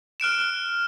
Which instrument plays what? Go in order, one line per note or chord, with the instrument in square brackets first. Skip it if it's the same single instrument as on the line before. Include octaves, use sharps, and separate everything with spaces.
[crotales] F6 F#6 D7 E7